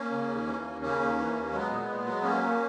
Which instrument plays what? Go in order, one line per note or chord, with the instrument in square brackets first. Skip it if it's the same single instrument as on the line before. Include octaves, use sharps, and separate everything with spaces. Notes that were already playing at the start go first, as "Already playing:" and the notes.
Already playing: [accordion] A#3 C#4
C#3
D#2
E3
D#2
C#3 A#3 C#4
D#2
E3
D#2
F#3 G#3 B3
A#2
A#2
F#3
F#3 A#3 C#4
A#2